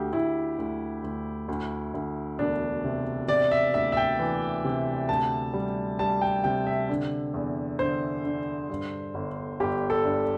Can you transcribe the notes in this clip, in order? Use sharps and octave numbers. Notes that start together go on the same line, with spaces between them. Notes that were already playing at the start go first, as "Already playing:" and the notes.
Already playing: D2 G4
D2 E4
D2
D2
D2
D2
E1 D4
C3
C3 D5
E5
D2 E5
E5
G5
E3
C3
D2 A5
G3
G3 A5
G5
C3 G5
E5
D3
E2
D3 C5
D3
G2
G1
G1 G4
A4
G2